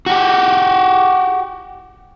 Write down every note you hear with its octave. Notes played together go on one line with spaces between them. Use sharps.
F#4 G4